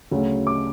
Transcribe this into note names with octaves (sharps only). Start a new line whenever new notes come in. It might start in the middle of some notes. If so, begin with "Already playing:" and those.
D2 C#3 F#3
D6